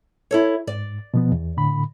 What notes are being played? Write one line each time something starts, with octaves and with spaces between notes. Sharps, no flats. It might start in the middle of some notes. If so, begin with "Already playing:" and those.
E4 A4 C#5
G#2 D5
B2 F3 B3
E2
A2 D3 B5